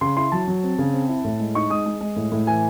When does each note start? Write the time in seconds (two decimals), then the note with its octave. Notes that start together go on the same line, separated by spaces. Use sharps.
0.01 C#3 C6
0.17 E4 C6
0.32 F#3 A5
0.48 F#3
0.63 C4
0.78 C#3
0.93 C4
1.09 E4
1.24 A2
1.40 G#3
1.55 D#4 C#6
1.70 G#3 D#6
1.86 G#3
2.01 G#3
2.16 A2
2.32 A2
2.47 E3 G#5